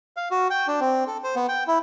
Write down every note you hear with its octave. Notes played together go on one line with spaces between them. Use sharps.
F5
F#4
G5
D4
C4
A4
C5
B3
G5
E4